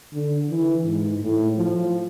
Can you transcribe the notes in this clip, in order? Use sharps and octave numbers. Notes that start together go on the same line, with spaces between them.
D3
E3
G#2
A2
F3